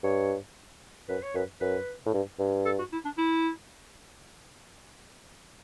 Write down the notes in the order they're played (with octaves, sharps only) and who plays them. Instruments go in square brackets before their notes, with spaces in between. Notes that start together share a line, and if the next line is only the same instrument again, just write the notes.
[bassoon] G2 [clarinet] C#5
[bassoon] F#2 [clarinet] B4
[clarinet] C#5
[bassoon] F#2 [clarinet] B4
[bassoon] F#2 [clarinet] B4
[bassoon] A2
G2
G2
[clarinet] A4
F#4
E4
D4
E4